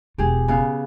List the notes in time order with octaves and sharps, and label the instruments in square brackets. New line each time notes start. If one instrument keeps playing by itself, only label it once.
[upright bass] E1 F4 [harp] G4 G#4
[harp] C#3 B3 F5